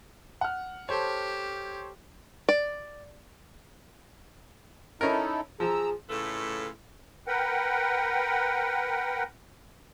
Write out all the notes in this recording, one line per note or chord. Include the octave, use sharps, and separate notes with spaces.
F#5 F6
G4 A4 C5 C#5
D5
C#4 D#4 E4 A4 A#4
F3 G#4 A#5 E6
A2 C#3 A3 F4 A4 B4
A#4 B4 F#5 G5